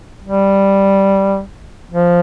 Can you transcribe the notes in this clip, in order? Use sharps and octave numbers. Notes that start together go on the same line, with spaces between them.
G3
F3